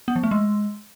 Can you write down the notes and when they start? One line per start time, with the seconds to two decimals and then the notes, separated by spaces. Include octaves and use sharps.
0.08 B3
0.16 F3
0.23 A3
0.31 G#3